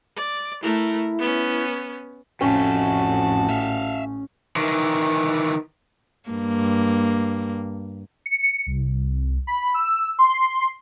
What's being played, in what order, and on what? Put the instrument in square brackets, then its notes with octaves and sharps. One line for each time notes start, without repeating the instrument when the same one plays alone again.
[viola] D5
[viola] A3 A#4 [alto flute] E4
[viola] B3 C#4
[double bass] A1 [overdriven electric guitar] F2 A3 [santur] C#4 [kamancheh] F#4 A5
[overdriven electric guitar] E5 F5
D#3 E3
[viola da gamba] G2 A#3
[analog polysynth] C#7
C2
B5
E6
C6